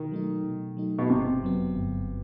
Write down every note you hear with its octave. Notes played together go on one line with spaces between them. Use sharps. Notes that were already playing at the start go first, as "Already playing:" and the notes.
Already playing: B2 D#3
F#3 A3 D#4
B2
F#3 A3 D#4
B2
G1 C3
F#2 F#3 B3
G1